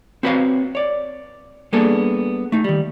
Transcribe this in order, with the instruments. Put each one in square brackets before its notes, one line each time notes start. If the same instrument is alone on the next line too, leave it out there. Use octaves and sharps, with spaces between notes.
[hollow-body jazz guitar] C4 F#4 B4 C#5 D#5 F5
C#5 D5
G3 A#3 B3 D4 G#4 A4
A3 D#4
D#3 G3